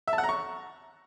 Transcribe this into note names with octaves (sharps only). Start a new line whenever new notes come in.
E5
A5
F#5
A#5
C#6